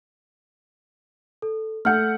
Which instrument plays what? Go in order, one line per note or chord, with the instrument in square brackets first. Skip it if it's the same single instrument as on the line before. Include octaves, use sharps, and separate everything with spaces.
[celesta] A4
[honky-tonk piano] A3 F#5 [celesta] F6 G6